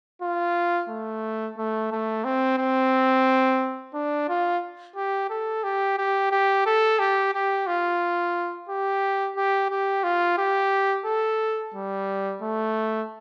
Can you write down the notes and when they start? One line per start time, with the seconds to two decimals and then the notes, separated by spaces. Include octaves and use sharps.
0.22 F4
0.89 A3
1.58 A3
1.92 A3
2.24 C4
2.58 C4
3.94 D4
4.29 F4
4.96 G4
5.30 A4
5.64 G4
5.98 G4
6.31 G4
6.66 A4
6.99 G4
7.34 G4
7.67 F4
8.69 G4
9.36 G4
9.70 G4
10.04 F4
10.38 G4
11.05 A4
11.74 G3
12.42 A3